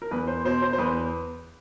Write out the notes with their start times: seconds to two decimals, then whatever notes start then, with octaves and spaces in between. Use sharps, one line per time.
0.02 A#4
0.11 E2 B4
0.27 C5
0.45 B2 C5
0.62 C5
0.73 C5
0.78 E2 B4